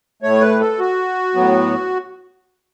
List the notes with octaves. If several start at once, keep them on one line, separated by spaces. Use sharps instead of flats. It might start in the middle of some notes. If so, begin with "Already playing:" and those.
A2 A3 C#5
B4
A4
F#4
A2 F#3 B3